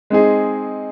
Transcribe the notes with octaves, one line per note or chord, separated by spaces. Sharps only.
G#3 C4 D#4 G#4